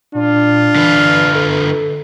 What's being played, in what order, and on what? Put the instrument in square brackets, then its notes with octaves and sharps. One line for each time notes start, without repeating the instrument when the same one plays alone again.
[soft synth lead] A#2 [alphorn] D4 [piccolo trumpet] F4
[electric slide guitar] D3 B4 [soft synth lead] E3
[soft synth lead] A4